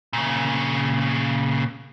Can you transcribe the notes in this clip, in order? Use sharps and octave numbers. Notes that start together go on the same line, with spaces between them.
A#2 C#3